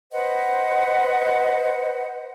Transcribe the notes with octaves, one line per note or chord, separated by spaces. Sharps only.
B4 C5 D#5 F#5